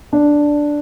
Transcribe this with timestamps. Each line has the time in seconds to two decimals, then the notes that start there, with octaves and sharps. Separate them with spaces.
0.13 D4